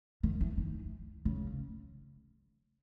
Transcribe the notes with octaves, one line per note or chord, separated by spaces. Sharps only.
D#3
E3
D#3
C#3